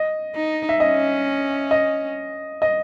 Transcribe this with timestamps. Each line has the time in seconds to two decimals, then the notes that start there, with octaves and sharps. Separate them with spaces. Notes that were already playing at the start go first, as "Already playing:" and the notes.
Already playing: D#5
0.35 D#4
0.69 E5
0.80 C#4 D#5
1.71 D#5
2.62 D#5